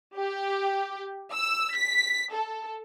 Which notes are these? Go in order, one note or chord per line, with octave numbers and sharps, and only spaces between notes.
G4
E6
B6
A4